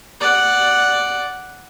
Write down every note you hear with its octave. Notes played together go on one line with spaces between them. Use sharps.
D5 F#5